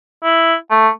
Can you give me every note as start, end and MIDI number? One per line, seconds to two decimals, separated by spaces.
0.24 0.54 64
0.71 0.89 57